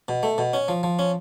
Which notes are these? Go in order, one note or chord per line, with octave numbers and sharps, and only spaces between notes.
B2
A3
B2
C#4
F3
F3
C#4